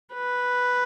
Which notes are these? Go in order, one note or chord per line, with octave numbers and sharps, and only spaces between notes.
B4